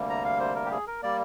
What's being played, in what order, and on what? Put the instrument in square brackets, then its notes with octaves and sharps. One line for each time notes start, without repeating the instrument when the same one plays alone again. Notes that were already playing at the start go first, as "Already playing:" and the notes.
Already playing: [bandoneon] D2 C3 G3 A#3
A#5
F5
C5
A#4
G4
G#4
A#4
G3 A#3 D5